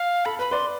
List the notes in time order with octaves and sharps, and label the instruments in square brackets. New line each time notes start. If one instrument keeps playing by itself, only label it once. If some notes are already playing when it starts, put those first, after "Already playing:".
Already playing: [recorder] F5
[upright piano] A4 [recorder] B5
[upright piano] B4 [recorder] B5
[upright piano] B4 D5 [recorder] C6